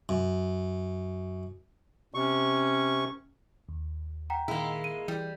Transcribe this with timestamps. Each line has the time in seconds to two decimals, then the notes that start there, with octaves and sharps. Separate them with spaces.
0.09 F#2
2.14 C3 C#4 C#6
3.69 D#2
4.30 F#5 G5 A#5
4.48 A#2 D#3 G#3 A#3 E4
4.84 D#7
5.08 E3 G3